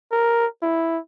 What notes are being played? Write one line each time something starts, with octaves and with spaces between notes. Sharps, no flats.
A#4
E4